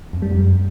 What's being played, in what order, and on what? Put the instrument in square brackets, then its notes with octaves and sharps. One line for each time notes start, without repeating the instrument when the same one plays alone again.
[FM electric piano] F2
G3
F#2